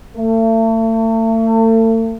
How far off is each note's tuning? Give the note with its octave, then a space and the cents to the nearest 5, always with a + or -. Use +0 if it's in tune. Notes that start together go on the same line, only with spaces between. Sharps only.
A3 +40